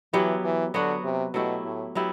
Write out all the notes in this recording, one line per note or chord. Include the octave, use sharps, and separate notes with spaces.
E3 F#3 B3 E4 G4
E3
D3 F#3 B3 F#4
C3
B2 F#3 A3 E4 G4
A2
F#3 B3 E4 G4